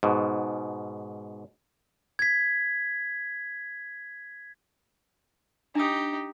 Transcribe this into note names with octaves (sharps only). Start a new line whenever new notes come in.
G#2 B2
G#6 B6
D4 D#4 G4 D#6